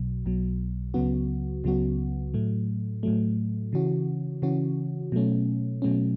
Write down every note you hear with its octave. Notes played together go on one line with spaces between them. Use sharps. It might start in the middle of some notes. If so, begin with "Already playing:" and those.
Already playing: B1 B2 F#3
B1 B2 F#3
C#2 C#3 F#3 B3 F#4
C#2 C#3 F#3 B3 F#4
A2 F#3 A3
A2 F#3 A3
C#3 E3 C#4 F#4
C#3 E3 C#4 F#4
B2 F#3 A3 C#4
B2 F#3 A3 C#4